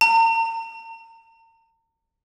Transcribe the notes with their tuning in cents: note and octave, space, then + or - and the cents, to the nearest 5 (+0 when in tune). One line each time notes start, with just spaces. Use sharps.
A#5 -45